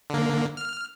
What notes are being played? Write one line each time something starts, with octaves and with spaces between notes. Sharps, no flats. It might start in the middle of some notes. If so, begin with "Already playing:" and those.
D3 A#3
F6